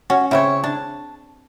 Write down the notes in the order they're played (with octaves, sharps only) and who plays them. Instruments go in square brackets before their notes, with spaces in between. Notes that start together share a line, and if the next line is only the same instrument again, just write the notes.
[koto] C#4 [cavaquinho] F#4
[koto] C#3 C4 [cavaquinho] E4 C#5
[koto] D4 [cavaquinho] A5